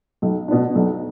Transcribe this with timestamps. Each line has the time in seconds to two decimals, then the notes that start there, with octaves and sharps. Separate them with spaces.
0.22 B1
0.48 B2 B3 D4
0.75 B1